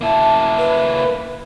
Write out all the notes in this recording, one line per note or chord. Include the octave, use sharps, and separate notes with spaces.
A#3 E4 A5
B4